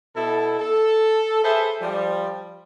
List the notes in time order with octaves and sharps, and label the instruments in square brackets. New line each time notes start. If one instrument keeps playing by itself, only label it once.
[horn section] B2 E4 A4
A4
G#4 A4 B4 C5 E5
F3 G3